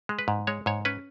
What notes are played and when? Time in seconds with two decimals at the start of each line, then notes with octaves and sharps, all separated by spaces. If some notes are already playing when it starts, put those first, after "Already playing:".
0.09 G#3
0.19 B4
0.28 G#2
0.47 G#3 C#5
0.66 G#2 C#5
0.85 C#4 B4